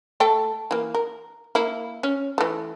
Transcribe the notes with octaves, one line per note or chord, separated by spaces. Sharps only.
A3 A4 G5
E3 A#3
A#4
A#3 E4
C#4
E3 A3